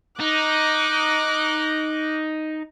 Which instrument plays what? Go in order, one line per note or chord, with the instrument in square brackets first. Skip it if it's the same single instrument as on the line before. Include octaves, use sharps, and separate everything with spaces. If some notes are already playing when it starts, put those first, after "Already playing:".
[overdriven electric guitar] D#4 [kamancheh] D6 F#6